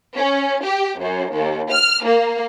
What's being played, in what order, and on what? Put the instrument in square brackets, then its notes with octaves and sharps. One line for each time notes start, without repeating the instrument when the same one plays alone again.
[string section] C#4
G4
F#2
D#2
F6
A#3